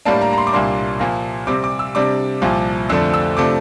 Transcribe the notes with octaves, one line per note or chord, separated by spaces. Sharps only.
A2 G3 A#3 D4 A5
A#5
A#5
C6
D6
C2 A#2 G3 A#3 D4 C6
A#2 F3 A#3
C3 G3 C4 D6
D6
E6
C3 G3 D4 D6
C2 A#2 F3
F2 D3 F3 A3 D4 E6
E6
C3 F3 A3 D4 D6